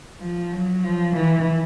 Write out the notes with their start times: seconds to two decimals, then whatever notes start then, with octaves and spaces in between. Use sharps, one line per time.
0.21 F3
0.53 F#3
0.84 F3
1.16 E3